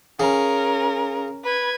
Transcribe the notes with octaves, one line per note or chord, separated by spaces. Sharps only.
C#3 C#4 A#4
B4 G#6